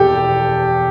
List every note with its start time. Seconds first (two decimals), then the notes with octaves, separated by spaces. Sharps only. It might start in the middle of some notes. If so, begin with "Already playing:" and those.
Already playing: E1 E2 G4 A4